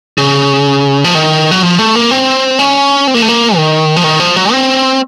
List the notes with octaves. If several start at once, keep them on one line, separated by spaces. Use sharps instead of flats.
C#3
F3
D#3
F#3
F3
A3
A#3
C4
C#4
C4
A#3
A3
A#3
D#3
F3
D#3
F3
F#3
C4